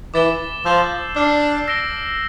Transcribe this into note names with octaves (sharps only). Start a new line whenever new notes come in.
E3 D6 A6 E7 G7
F3 E6 G6 C7 E7 G7
D4 D6 F6 C7
E6 A#6 D7 G7